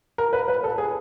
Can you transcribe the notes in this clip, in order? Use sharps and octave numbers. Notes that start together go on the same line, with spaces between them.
A#4
B4
B4
A4
G#4